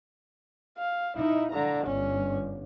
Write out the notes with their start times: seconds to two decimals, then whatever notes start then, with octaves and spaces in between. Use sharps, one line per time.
0.78 F5
1.17 D#4 E4
1.53 D3 A#5
1.86 G1 C#4